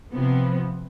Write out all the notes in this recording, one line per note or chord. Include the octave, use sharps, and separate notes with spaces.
C3 F3 B3